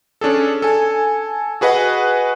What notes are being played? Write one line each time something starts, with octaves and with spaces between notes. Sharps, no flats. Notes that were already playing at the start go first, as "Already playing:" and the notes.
C#4 D4 G#4 A4
A4 G#5
F#4 G#4 B4 D#5 F#5